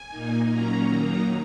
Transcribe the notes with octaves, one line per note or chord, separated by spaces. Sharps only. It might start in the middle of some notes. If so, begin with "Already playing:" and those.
Already playing: G#5
A#2 A#3 D#4
A#2 F#3 A#3 C#4 A#5
D#3 F#3 A#3 D#4 A#5